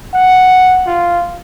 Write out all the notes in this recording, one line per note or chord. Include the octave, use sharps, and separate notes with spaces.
F#5
F4